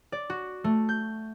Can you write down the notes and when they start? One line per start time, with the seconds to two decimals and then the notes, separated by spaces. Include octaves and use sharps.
0.12 D5
0.30 F#4
0.64 A3
0.89 G6